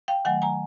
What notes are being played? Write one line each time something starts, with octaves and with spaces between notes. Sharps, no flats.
F5 G5
D#3 F#3 A3 F#5 G#5
G#5 A#5